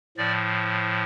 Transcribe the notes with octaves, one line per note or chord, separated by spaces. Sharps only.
A2 F3 D5